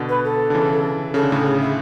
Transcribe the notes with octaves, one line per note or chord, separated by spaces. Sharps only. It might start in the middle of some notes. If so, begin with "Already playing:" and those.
Already playing: B2 D3
B4
A4
D3
C#3 E3
C#3 A4
D3
A2 C#3 A4
G#4
E4